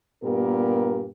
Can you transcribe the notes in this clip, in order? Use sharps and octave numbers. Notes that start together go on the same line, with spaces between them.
G2 A#2 B3 G4 A#4 B4